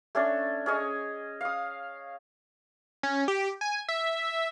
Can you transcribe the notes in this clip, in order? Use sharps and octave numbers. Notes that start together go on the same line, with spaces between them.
A3 C#4 D4 A4
C#4 G#4 C#5 D#5
F5 D#6
C#4
G4
G#5
E5